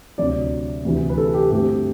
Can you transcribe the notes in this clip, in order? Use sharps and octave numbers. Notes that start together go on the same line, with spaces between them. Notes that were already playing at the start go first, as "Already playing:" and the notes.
D2 C3 F#3 C4 D5
D2 C3 E3
B4
A4
G4
G2 D3 A3 C4 G4